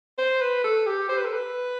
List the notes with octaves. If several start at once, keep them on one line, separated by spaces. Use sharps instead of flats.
C5
B4
A4
G4
C5
B4
A4
B4